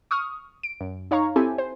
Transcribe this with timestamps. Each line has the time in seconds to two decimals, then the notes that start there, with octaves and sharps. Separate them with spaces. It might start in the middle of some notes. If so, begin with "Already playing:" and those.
0.11 C#6 D#6 F6
0.63 D7
0.81 F#2
1.11 D#4 C#5 F5 A#5 C#6
1.36 C4 E4 G4 A4 G#5
1.58 C5